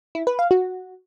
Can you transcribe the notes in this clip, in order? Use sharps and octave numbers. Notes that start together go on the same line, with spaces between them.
E4
B4
F5
F#4